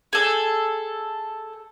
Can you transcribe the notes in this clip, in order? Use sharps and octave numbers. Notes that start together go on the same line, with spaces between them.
G#4 A4